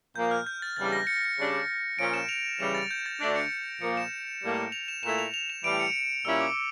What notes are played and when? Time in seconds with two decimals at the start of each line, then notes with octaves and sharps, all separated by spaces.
0.16 A#2 F3 A#3 G6
0.31 F6
0.47 G6
0.62 A6
0.76 E2 C#3 G3 D4 A6
0.92 A#6
1.07 C#7
1.16 A#6
1.25 C#7
1.38 C#3 G3 D4
1.99 A#2 F3 C#4 D7
2.14 E7
2.29 F7
2.60 C#3 E3 G3 E7
2.75 A6
2.91 G6
3.06 A6
3.20 D2 D3 A3 D4 A#6
3.36 C#7
3.81 A#2 F3 A#3 C#7
3.97 E7
4.43 A2 G3 A#3
4.72 F7
4.88 E7
5.03 A#2 A3 E4 E7
5.18 F7
5.34 F7
5.50 E7
5.64 A2 E3 G3 D7
5.80 C#7
6.25 A#2 G3 C#4 E4 E6
6.41 D6